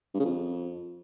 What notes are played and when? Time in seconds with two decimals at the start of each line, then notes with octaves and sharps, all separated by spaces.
0.14 G2
0.20 C#3
0.25 F2